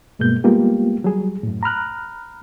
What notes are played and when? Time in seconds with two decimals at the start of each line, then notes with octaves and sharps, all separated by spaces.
0.19 G2 B2 G#3 A#3 G6
0.44 G3 G#3 A#3 B3 F4 G4
1.04 F#3 G3 G#4
1.43 F#2 A2
1.63 A#5 B5 F6 F#6